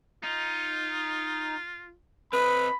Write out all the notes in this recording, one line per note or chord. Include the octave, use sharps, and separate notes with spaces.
D#4 F4
C4 B4 D#5 B5